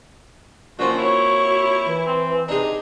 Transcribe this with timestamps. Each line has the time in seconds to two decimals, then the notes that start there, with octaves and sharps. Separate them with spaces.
0.79 A#2 F3 C4 C#4 F#4
0.97 E4 F#4 C#5
1.86 E3
2.06 C4
2.48 C3 D4 D#4 G#4